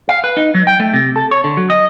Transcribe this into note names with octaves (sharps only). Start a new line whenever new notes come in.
F5
B4
D#4
F#3
G5
A3
C3
A4
C#5
D3
F#3
D#5